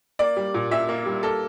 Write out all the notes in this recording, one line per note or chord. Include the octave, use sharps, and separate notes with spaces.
A#3 D5
G3
A#2
A#2 E5
A#3
G3
A#3 A4